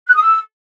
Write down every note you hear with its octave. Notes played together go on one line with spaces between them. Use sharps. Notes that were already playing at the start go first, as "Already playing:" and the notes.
F#6
D#6
E6